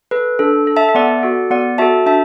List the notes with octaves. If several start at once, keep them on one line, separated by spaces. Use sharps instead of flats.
A4 B4
D4 A4
A4
E5 A5
E5
B3 D5 F#5
F#4 A4
B3 D5 F#5
F#4 A4 E5 A5
D4 E5 A5